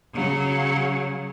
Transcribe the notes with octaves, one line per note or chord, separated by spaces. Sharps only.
C#3 F#3